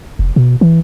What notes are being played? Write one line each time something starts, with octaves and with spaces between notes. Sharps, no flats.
F1
B2
E3